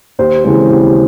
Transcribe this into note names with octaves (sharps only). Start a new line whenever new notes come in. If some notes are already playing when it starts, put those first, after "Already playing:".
D#2 C5
C#3 E3 G#3 C4
D#2